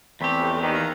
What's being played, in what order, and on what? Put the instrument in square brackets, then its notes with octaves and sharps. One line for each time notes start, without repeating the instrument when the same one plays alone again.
[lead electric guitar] E2 G4 [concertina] A3 C4 B5
[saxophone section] F2 A2 C3
D#2 D#3
[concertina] F5 A#5